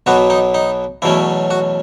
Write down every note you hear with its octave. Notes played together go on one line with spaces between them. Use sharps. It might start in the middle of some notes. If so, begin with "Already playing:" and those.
B1 B2 F#3 B3 F#4
D#4
D#4
E2 B2 F#3 A3 C#4 E4
F#4